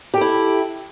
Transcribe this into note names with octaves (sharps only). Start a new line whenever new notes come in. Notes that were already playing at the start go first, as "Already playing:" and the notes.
E4 G4 A4